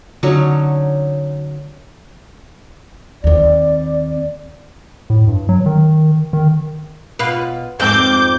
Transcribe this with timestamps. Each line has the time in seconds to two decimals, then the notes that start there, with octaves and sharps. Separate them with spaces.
0.23 D3 F#3 C#4 D#4
3.24 D#2 C4 D5
5.10 A2
5.27 G2
5.49 F#3
5.66 D#3
6.33 D#3
7.19 B2 F4 B4
7.80 F2 G#2 C4 D6 G6